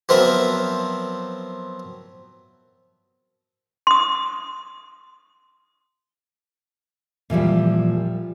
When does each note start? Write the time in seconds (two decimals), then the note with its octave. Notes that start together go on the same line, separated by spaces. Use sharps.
0.09 F3 F#3 B3 C4 A#4 E5
3.87 C6 D#6
7.30 A#2 E3 F3 G3